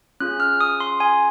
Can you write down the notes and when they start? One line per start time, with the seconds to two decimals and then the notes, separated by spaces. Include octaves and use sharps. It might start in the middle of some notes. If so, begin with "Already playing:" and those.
0.20 C#4 F4 G#4 F#6
0.40 F6
0.61 D#6
0.80 C6
1.00 G#5